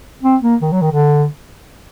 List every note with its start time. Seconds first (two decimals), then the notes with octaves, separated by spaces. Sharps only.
0.23 C4
0.42 A#3
0.62 D#3
0.72 F#3
0.82 D#3
0.92 D3